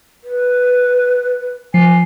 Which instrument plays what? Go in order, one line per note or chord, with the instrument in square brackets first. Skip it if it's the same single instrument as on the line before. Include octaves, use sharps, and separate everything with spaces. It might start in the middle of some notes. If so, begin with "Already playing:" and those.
[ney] B4
[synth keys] F3 C7 [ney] G#5